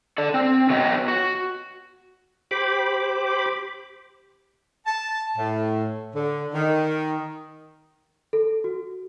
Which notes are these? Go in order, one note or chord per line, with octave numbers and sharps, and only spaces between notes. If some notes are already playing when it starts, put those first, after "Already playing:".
A4 D5
C4
B3 F#4 B4 C#5 D#5 G5
F#4
G4 C5 B5 D6
A5
A2
D3
D#3
A4
F#4